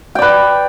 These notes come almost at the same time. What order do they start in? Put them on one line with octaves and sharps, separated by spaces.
G5 D5 B4